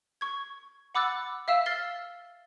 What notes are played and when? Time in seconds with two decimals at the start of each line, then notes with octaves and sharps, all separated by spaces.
0.21 C#6 G#6
0.95 F#5 B5 D6 E6 F#6 A6
1.48 E5 F5 E6 B6 E7
1.66 F6 A6 C7 G7